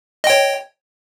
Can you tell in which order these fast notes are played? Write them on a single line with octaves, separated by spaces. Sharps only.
D#5 G5 C#5